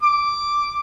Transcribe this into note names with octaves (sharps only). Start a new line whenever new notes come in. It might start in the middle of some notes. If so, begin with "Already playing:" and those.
D6